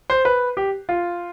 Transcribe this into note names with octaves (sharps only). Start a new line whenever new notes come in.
C5
B4
G4
F4